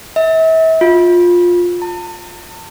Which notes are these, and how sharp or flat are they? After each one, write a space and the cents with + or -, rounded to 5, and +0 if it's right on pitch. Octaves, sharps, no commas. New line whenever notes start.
E5 -35
F4 +15
A5 +45